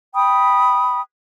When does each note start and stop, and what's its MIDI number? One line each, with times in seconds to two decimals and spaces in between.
0.14 1.00 79
0.14 1.00 83
0.14 1.00 87